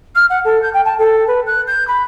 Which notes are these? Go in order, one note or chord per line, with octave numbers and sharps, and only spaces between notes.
F6
F#5
A4
G6
G5
A5
A4
B4
F#6
G6
B5